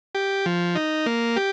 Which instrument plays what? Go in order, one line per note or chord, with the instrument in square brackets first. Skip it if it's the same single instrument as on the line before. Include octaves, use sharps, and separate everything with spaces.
[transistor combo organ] G4
F3
D#4
A#3
G4